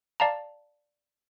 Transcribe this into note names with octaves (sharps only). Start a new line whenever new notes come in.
D5 F5 A5 A#5